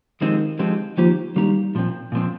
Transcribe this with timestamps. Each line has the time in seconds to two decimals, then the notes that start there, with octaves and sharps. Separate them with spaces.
0.21 D#3 F3 G#3 C4 D#4 G4
0.59 F3 G#3 C4 D#4 G4
0.98 D#3 F3 A#3 D#4 G4
1.36 D#3 G3 A#3 D#4 G4
1.75 A#2 F3 C4
2.12 A#2 F3 C4